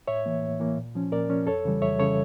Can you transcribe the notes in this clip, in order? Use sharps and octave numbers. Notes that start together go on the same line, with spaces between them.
A2 C#5 E5
E3 A#3
A2
E3 A#3
A#2
F3 C#4
A#2 A#4 D5
F3 C#4
F2 A4 C#5
C#3 E3 G3
F2 C#5 E5
C#3 E3 G3 A4 C#5